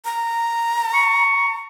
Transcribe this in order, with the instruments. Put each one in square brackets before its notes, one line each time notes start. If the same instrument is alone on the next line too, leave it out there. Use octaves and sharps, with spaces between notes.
[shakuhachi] A#5
[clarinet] C#6